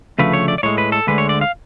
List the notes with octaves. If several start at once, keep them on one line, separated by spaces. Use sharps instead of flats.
D2 C#3 F3 A3 B4
C#5
D5
D5
A2 G#3 C#5
B4
A4
D2 D3 G#3 B4
C#5
D5
F5